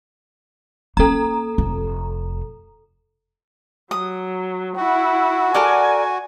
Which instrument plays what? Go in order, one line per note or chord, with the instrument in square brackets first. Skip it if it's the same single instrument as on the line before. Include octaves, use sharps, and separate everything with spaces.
[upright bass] A#3 C#4 [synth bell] A4 A#5
[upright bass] F1
[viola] F#3 [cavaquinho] D#6
[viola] E4 [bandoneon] F#4 [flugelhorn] F#5
[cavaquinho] A4 A#4 D5 [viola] G#5